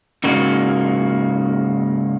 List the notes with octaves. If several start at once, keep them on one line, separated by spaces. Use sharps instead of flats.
G#2 C#3 A#3 F#4